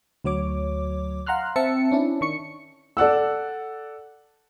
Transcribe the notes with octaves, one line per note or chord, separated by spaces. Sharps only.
D2 F#3 C#5 D6
F5 F#5 A#5 C6 F6 F#6
C4 E5 A5 C#7
C#4 D4 E4
D#3 C#6 C#7
A4 D5 F#5 E6